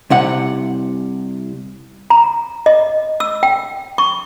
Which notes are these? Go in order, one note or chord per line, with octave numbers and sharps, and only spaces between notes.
C2 C3 F#5
A#5
D#5
E6
G5
C#6